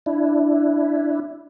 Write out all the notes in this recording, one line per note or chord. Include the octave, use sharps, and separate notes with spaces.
D4 E4